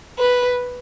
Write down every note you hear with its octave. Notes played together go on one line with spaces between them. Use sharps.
B4